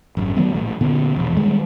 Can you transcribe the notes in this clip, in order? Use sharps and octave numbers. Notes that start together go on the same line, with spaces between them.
G#1 F#2
D#3 F#3 A3 B3
A#1 A2
A#2 D3 B3
E1 A#1
D#3 G3 G#3